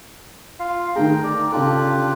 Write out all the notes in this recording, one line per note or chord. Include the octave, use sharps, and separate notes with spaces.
F4 F5
D#3 A3 G#4 G5 A#5
D5 A#5
C#3 D4 F4 G4 A4 F#6